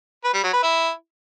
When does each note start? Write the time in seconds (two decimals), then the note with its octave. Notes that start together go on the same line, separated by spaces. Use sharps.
0.24 B4
0.34 G3
0.43 F#3
0.53 B4
0.63 E4